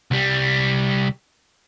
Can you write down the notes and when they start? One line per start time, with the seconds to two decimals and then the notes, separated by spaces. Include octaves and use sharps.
0.11 C2 G3